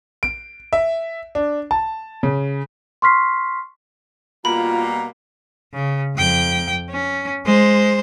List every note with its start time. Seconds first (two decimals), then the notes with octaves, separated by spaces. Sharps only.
0.23 D7
0.73 E5
1.35 D4
1.71 A5
2.23 C#3
3.02 C6 C#6 F6 B6 C7
4.45 B2 G3 A#3 F4 A#5 B5
5.73 C#3
6.15 F2 G5
6.90 C#4
7.45 G#3 C5